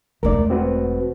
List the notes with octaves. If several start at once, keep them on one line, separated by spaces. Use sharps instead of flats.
E1 A3 A#4 D5
C4 F#4 B4